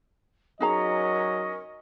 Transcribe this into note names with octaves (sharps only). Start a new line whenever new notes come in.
F#3 C#4 D#4 G#4 A#4 D#5 A#5